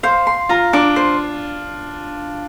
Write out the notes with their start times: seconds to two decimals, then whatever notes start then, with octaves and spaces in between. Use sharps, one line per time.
0.03 C5 F5
0.27 C6
0.49 F4 A#5
0.73 D4 D6
0.96 C5